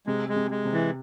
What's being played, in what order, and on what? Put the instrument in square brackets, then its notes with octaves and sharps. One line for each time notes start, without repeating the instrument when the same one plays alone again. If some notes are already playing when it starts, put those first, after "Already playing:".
[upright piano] C3 [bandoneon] G#3
[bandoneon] G#3
[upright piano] C3
[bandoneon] G#3
[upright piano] C3
[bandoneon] E3